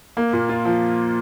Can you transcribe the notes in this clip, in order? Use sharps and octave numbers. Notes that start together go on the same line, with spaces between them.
A#3
A#2
F4
F3